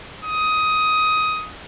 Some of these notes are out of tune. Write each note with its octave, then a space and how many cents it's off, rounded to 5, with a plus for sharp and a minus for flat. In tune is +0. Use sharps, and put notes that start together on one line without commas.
D#6 +15